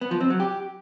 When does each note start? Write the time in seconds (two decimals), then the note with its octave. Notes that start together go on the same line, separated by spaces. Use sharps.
0.01 B3
0.11 F3
0.21 C4
0.30 F#3
0.40 G4